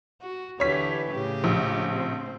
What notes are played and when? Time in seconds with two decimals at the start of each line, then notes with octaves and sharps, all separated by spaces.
0.22 F#4
0.60 D3 E3 G4 C#5 B6
1.12 A2 C#3 G4
1.44 A#1
1.93 C4